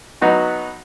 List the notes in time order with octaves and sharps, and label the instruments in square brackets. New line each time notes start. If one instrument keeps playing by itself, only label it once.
[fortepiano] F#3 B3 D#4 F#4